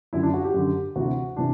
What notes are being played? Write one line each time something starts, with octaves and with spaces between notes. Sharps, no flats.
F#2 D3 E4
D4
F#4
G4
F#2 D3
D2 C3 E3 F#4
C3 E3 D4